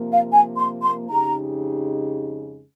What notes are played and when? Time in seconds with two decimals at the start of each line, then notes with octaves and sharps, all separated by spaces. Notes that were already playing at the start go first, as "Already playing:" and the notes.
Already playing: C3 F3 A#3
0.12 F5
0.32 G#5
0.57 C6
0.83 C6
1.08 F2 C#3 G#3 D#4 G4 A#5